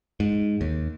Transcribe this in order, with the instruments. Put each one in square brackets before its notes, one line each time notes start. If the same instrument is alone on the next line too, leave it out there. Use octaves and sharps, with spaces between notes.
[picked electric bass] G#2
D#2